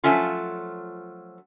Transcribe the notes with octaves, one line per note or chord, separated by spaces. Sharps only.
F3 F#3 A3 C#4 F4